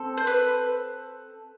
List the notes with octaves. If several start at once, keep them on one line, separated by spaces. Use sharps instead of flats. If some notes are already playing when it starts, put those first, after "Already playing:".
Already playing: C4 A4
C5
B4